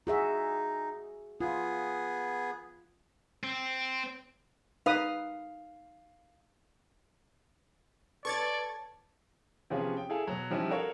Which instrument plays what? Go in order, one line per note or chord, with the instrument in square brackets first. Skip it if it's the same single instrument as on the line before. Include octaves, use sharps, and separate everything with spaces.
[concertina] D#4 [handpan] F#4 G#4 E5
[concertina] B3 G#4 [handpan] F4
[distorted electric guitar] C4
[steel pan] D#4 B4 D#6 [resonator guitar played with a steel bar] F5
[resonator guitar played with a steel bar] A4 C#5 [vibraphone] B4 [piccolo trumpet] D5 [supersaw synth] C#6 G#6 A6
[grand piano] C3 F3 B3 C#4 F4 G#4
G5
E4 G#4 A4 F5 G#5
B2 F#3
F3 G3 C#4 D#4 E4
F#4 A4 A#4 C#5 F5 C#6